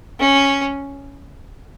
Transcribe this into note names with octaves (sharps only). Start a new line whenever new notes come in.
C#4